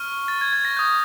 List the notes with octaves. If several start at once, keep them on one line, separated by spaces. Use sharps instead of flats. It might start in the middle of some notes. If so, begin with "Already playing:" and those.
Already playing: C#6 F6
A6
G#6
G#6
A#6
D#6 G6